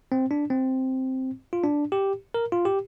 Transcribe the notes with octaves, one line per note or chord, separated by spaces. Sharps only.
C4
D4
C4
F4
D4
G4
A#4
F4
G4